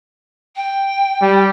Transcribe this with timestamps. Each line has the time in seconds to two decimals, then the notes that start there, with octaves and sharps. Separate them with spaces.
0.55 G5
1.22 G3